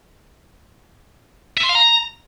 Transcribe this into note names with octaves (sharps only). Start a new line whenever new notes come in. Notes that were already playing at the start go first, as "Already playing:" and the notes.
E5
C6
F5
A#5